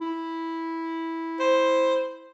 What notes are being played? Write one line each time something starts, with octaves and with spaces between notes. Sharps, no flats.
E4
C5